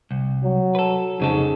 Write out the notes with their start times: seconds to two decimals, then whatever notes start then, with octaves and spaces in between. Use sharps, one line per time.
0.11 C2
0.43 F#3
0.75 A4 B4
1.20 F2 G#2 C#3 A4